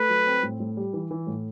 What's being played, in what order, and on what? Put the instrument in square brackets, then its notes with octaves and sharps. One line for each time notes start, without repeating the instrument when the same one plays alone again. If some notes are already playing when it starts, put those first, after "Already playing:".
Already playing: [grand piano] A3 [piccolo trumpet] B4
[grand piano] F#3
C4
A2
A2
G3
E3
E3
A2